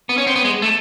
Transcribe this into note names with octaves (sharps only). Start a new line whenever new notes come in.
B3
C#4
C4
B3
G#3
A3